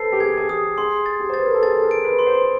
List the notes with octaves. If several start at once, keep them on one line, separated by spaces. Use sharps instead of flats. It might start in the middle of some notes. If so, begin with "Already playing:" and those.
Already playing: A4 B4 C5 C7
G4
G#4 G#6
G#4
G4 D#6
G#4 C6
A6
G4
C5
B4 A6
A#4
A4
G#4 A6
A4
A#4
D7
B4
C6
C5